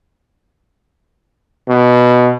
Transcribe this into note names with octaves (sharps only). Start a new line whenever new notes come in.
B2